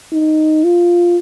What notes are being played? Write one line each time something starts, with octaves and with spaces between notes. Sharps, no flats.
D#4
F4